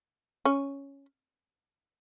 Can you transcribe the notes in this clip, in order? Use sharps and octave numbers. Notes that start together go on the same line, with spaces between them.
C#4